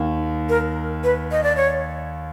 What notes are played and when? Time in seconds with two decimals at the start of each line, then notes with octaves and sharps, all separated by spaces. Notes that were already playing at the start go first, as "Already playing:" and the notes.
Already playing: D#2 D#3
0.49 A#4
1.04 B4
1.31 D#5
1.44 D5
1.56 C#5